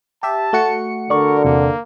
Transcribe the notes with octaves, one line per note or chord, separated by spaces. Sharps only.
G4 E5 A5
A3 F#4 C#7
D3 A#4 D5 C#6
E2 C3 A#3